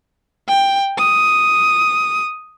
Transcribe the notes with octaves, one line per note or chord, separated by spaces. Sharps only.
G5
D#6